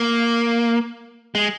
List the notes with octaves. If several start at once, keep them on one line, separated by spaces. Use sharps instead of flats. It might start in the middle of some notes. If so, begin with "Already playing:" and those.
Already playing: A#3
G#3